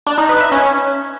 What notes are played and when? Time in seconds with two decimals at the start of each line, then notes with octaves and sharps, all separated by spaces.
0.07 D4
0.18 D#4
0.29 B4
0.40 E5
0.52 C#4